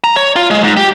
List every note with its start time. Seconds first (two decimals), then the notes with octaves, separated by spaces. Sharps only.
0.04 A#5
0.16 C#5
0.36 F4
0.51 G#3
0.64 G#2
0.77 G4